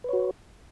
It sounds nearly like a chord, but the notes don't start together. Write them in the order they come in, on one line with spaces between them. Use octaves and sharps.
B4 C#5 F#4